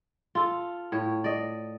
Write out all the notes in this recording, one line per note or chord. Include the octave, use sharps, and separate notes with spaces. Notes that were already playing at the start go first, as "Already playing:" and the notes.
F4 A4
A2 C#5
D5 D#5